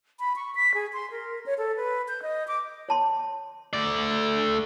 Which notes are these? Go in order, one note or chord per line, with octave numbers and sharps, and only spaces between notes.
B5
C#6
B6
G#4
C6
A#4
C#5
A4
B4
G6
D#5
D6
C#5 A5 C6
A3 D5